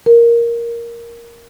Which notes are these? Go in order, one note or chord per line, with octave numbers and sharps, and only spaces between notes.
A#4